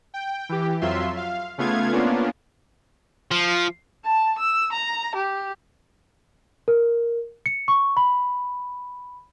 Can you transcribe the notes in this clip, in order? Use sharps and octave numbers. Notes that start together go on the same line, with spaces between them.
G5
E3 G4
F2 F#3 F4 E5 C6
F5
C#3 A3 B3 F4 F5 G#6
A#3 B3 C#4 D4 F4
F3
A5
E6
A#5
G4
A#4
C#7
C#6
B5